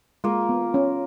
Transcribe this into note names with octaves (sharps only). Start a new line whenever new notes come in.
G#3 A#3 F4 A#4
B3
C#4